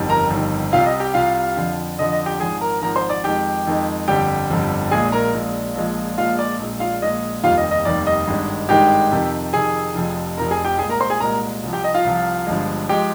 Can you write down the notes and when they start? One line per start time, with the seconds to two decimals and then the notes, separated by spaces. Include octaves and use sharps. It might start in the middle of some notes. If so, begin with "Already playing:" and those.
Already playing: G1 F2 D#3 G3
0.09 A#4 A#5
0.30 G1 F2 D#3 G3
0.73 C2 C3 G3 F4 F5
0.86 D#5
1.00 G4 G5
1.14 C2 C3 G3 F4 F5
1.57 F2 D3 F3
1.98 F2 D3 F3 D#5
2.12 D#5
2.26 G4 G5
2.40 G#1 G#2 F3 G#4 G#5
2.61 A#4 A#5
2.82 G#1 G#2 F3 A#4 A#5
2.96 C5 C6
3.10 D5 D6
3.24 F2 D#3 G#3 G4 G5
3.67 F2 D#3 G#3
4.08 G1 F2 D3 G3 G4 G5
4.50 G1 F2 D3 G3
4.91 A#1 A#2 G#3 G#4 G#5
5.12 A#4 A#5
5.34 A#1 A#2 G#3
5.75 A#1 A#2 F3 G#3
6.18 A#1 A#2 F3 G#3 F4 F5
6.39 D5
6.59 A#1 A#2 G#3
6.80 F4 F5
7.02 A#1 A#2 G#3 D#5
7.43 F1 D#2 D#3 G3 F4 F5
7.58 D#5
7.71 D#5
7.85 F1 D#2 D#3 G3 D5
8.07 D#5
8.27 G#1 G2 D#3 G#3
8.69 G#1 G2 D#3 G#3 G4 G5
9.11 F2 C3 D#3
9.53 F2 C3 D#3 G#4 G#5
9.95 F1 F2 C3 F3
10.37 F1 F2 C3 F3 A#4 A#5
10.51 G#4 G#5
10.65 G4 G5
10.79 C2 A#2 G#3 G#4 G#5
10.89 A#4 A#5
11.00 C5 C6
11.10 G#4 G#5
11.20 C2 A#2 G#3 A#4 A#5
11.63 C2 C3 F3
11.73 G4 G5
11.84 D#5
11.94 F4 F5
12.05 C2 C3 F3
12.47 G1 G2 F3 G#3
12.89 F3 G#3 G4 G5